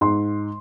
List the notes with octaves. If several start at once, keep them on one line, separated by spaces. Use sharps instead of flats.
G#2 C6